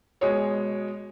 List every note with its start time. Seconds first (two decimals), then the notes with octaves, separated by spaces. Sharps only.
0.21 B2 G#3 C#5